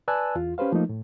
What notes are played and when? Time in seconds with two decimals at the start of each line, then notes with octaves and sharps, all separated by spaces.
0.08 B4 D5 G#5 A5 E6 F#6
0.35 E2 F4
0.58 C#4 G4 B4 C5 F5
0.72 F3 A3 A#3 D#4
0.89 A2